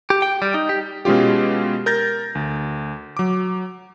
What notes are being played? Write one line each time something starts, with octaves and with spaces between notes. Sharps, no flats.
G4
G5
G3
D#4
G4
B2 G#3 C#4 F4 G4
A#4 G6 A6 A#6
D2
F#3 D6